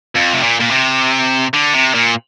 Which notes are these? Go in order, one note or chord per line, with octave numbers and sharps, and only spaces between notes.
F2
C3
A#2
A#2
C3
D3
C3
A#2